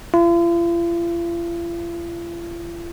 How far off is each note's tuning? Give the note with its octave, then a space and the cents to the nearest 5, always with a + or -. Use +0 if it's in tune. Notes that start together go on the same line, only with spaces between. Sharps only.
F4 -45